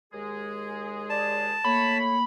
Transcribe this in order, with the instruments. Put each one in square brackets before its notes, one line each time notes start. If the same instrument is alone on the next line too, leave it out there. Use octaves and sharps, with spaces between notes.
[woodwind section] D#2 G#3 G#4
[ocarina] D5 [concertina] A5
[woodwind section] A3 C#5 [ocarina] A#3 [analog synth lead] B5